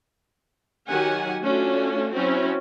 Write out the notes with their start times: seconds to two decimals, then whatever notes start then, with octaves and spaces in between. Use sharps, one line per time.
0.88 D#3 F#3 G4 F#5 G#5
1.41 A3 C#4 D4 F4 F#4
2.13 F#3 C4 C#4 E4